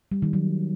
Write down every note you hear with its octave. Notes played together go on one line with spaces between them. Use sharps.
G3
D#3
F#3